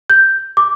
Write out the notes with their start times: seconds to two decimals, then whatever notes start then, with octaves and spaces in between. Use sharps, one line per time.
0.10 G6
0.57 D6